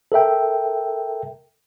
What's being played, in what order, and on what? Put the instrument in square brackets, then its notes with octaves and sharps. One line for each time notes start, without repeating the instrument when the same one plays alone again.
[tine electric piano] A4 A#4 E5 G5